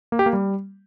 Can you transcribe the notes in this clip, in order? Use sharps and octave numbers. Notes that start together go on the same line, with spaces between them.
A#3
G4
A#3
G3